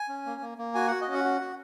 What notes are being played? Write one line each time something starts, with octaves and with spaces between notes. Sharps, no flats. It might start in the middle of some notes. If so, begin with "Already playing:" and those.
Already playing: G#5
C#4
A#3
A#3
A#3
F#4 G#5
F#4 F#5
D#5
C#4
F#5
F#4
F#4